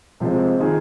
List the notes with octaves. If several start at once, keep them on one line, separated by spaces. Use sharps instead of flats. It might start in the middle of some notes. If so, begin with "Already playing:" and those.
C3 F3 G#3 C4
D#3 A#3 F4 G#4